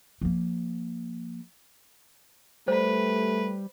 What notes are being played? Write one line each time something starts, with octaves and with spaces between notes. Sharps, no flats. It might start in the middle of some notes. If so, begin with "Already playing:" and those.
F3 A#3
G3 A3 B4 C5